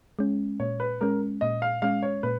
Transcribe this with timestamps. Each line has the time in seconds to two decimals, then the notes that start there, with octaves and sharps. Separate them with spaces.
0.19 G#3 C#4
0.60 A#2 C#5
0.80 B4
1.01 G#3 C#4 A#4
1.41 A#2 D#5
1.62 F5
1.82 G#3 C#4 F5
2.02 C#5
2.23 A#2 B4